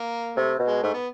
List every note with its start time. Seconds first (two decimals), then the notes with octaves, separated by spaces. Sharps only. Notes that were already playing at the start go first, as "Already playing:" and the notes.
Already playing: A#3
0.36 C3 A3
0.59 B2
0.68 G#3
0.83 G#2 A3
0.94 B3